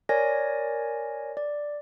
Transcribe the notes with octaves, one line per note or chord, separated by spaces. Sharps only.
A#4 C#5 D5 G#5 A#6
D5